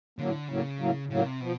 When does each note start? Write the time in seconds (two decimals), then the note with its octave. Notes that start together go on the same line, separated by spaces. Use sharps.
0.19 A2 D3 F#3 A#3
0.49 A2 C#3 F#3 A#3
0.80 A2 F#3 A#3
1.10 A2 C#3 F#3 A#3
1.26 C3
1.41 B2 F3